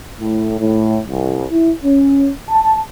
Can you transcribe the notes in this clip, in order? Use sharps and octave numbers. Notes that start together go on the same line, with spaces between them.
A2
A2
C2
E4
C#4
A5